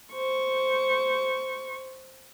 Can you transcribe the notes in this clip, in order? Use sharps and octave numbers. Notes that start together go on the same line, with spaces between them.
C5 C#6